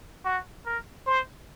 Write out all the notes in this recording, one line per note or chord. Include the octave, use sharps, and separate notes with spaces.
F#4
A#4
C5